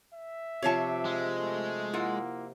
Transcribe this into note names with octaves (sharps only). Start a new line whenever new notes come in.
E5
C3 F3 C#5 F5 A5 C#6
G#3
A3
A#3 E4 F4 F#5